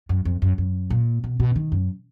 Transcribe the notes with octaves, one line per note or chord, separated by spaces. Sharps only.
F#2
F2
F#2
F#2
A#2
B2
B2
D#3
F#2